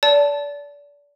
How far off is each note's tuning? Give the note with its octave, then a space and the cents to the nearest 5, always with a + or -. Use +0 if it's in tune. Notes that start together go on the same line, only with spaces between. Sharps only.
D5 -30 A5 +0